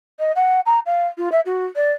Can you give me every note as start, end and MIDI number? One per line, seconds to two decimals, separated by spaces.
0.19 0.32 75
0.35 0.60 78
0.66 0.79 82
0.86 1.06 77
1.17 1.29 65
1.32 1.40 76
1.45 1.65 66
1.76 1.92 74